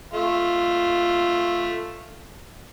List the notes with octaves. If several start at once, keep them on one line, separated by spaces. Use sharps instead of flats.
A3 F4